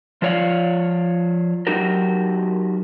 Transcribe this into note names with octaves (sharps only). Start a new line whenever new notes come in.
F3 F4 C#5 D5 F5
F#3 D#4 F#4 G4 A#4